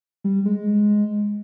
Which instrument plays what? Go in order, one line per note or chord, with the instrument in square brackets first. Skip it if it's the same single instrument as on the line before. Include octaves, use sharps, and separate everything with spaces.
[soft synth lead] G3
G#3